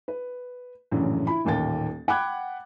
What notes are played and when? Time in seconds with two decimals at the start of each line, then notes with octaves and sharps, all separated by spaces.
0.08 B4
0.91 A#1 F#2 A2 C#3 E3
1.27 E4 B5
1.44 D#1 A1 D#2 A#3 G5 A6
2.08 F#5 G5 B5 D6 F#6 G#6